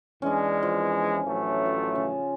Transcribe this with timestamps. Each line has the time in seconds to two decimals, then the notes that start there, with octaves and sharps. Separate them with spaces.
0.22 E2 E3 G#3 C#4 D4
0.63 F3
1.25 A1 F#3 A3
1.66 F4
1.95 C#3